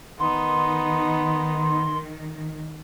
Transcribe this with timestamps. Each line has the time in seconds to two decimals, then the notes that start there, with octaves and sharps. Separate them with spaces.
0.20 D#3 B3 D#4 C6